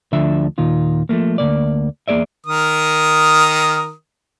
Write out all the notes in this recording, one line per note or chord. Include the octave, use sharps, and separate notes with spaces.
D2 D3 F3 D4 E5
D#2 A#2 D#3 F4
F3 A3 A#3
D2 C3 A#3 D5
E2 A#3 G#4 D5 E5
D#3 A#4 D#6